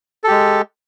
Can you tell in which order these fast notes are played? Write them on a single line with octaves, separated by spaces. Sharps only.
A4 G4 G#3